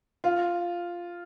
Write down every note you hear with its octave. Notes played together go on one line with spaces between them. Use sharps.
F4